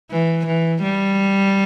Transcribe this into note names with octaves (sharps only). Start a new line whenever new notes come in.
E3
E3
G3